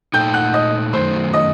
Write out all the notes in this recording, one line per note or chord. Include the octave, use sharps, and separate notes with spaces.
A#2 A3 D#4 A4 G5 G6
F#5 F#6
D#5 D#6
F#2 D#3 A3 C5 C6
D#5 D#6